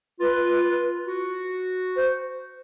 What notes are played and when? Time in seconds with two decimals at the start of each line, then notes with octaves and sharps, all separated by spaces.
0.20 F4 B4
1.07 F#4
1.95 C5